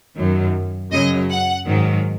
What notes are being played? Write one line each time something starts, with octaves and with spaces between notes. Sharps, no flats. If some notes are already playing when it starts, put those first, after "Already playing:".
F#2 D#3 F#3
F#2 C#3 F#3 D#5
F#5
G#2 D#3 F#3